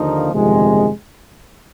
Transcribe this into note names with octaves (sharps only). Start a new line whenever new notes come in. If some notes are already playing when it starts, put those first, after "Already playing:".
Already playing: D#2 D3 F3 A#3 D#4
G1 F2 C3 D#3 G#3